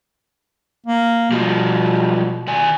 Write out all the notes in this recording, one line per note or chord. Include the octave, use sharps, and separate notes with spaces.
A#3
B2 F3 G3 G#3
D#3 D5 G#5